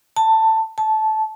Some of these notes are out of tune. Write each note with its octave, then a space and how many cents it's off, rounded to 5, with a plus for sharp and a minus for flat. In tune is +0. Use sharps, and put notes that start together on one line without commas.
A5 +15
A5 -15